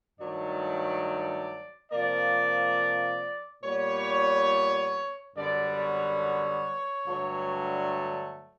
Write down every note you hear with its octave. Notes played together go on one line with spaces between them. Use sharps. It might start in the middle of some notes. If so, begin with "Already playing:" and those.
G2 D#3 F#3 A3 D5
C3 F3 A#3 D5
A#2 G3 B3 C#5
F#2 D3 G3 B3 D5
C#5
G2 D3 F#3 A3